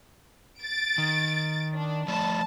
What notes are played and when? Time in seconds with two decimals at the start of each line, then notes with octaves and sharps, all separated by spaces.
0.61 A6 D7
0.98 D#3
1.74 D4
2.08 F3 A3 D5 A5